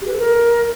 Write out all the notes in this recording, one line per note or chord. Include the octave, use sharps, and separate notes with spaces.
G4
B4
A4
A#4